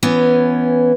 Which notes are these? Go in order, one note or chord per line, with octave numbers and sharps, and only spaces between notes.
E3 B3 C#4